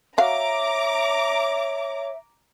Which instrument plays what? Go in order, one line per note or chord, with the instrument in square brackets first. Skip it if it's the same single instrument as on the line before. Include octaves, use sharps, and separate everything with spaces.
[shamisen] F#4 F5 [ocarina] C#5 [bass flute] E5 [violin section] A#5 D6